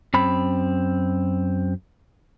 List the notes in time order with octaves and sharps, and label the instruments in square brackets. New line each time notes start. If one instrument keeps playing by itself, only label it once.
[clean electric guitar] F#2 C4 B5